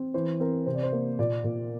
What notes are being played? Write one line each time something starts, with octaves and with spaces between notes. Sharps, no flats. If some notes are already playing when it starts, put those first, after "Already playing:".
Already playing: C4
E3 C5
C4 A#4
C3 C5
D5
C5
A#3
A#2 D5
A#2